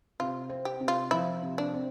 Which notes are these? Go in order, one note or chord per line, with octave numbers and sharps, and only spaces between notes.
C3 F4
C4
G4
C3
F4
F3 E4
C3
D4
C4